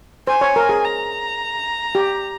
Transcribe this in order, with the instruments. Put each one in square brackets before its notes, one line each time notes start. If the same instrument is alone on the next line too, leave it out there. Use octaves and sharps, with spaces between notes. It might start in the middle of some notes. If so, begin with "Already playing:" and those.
[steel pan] C5 [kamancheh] G#5
[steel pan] C#5
A#4
G#4
[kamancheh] A#5
[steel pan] G4